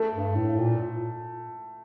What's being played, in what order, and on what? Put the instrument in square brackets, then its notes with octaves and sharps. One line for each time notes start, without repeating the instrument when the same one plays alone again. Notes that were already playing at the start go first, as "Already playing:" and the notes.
Already playing: [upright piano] A3
[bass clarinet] G2
A2
A#2